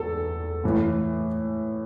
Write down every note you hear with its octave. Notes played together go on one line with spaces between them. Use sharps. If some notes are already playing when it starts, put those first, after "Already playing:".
Already playing: E2 A4
A2 E3